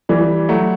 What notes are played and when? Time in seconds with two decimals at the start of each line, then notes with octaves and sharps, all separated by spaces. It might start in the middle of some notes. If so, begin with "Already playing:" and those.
0.09 E3 G3
0.49 F#3 A3